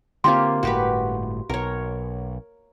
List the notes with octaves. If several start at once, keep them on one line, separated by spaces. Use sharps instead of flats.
D3 A#3 C4 F4 G4 C6
G1 A2 F#4 G4 B4
B1 A#4 C#5